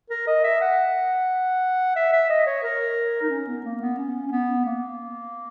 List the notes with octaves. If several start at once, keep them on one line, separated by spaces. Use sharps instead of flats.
A#4
D#5
E5
F#5
E5
E5
D#5
C#5
A#4
D#4
C#4
B3
A#3
B3
C#4
C#4
B3
A#3